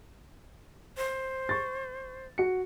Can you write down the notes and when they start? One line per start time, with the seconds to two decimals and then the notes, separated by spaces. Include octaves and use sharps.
0.97 C5
1.49 C#6 A6
2.38 F#4 C#7